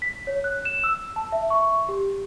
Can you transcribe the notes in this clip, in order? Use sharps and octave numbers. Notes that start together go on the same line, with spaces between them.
B6
C#5
F#6
E7
E6
A5
E5
C#6
G4